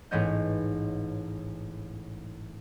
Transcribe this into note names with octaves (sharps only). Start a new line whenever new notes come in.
A1 G#2 B3 C#5 D#5 G6